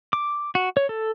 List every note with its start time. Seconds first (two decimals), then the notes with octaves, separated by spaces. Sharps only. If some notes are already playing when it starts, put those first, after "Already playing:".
0.13 D6
0.55 F#4
0.77 C#5
0.89 A4